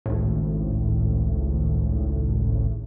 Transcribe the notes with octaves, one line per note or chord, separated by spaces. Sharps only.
G#1 C#2 A2